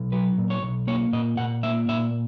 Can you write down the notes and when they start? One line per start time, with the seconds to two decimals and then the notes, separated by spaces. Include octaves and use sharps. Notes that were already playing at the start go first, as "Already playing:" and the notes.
Already playing: B1
0.12 F#3 B4
0.38 A#2
0.50 C#5
0.63 B1
0.87 A#3 C#5
1.12 A#2 D#5
1.37 A#2 F#5
1.63 A#3 E5
1.88 A#2 E5